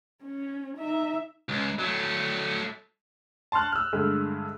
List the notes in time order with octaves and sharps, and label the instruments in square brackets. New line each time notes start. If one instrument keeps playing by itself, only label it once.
[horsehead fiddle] C#4
D#4 E5
[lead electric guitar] C#2
F#3 A3
[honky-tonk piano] A5 C6 C#6 F6 F#6
E6 F6
G2 D3 G#3 A3